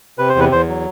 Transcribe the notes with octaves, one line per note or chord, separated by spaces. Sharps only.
C3 B4
C5
E2 B4
E2 C5
F#3